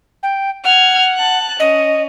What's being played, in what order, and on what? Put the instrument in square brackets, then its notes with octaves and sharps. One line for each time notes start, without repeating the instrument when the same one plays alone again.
[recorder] G5
[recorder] F#5 [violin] F6 G#6
[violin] A5 F#6
[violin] C#4 [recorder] D#5